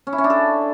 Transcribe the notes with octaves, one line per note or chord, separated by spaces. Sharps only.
C#4
E4
C#4
D4
A4